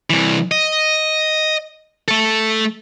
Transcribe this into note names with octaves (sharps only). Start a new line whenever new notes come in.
C2 E3
D#5
A3 A4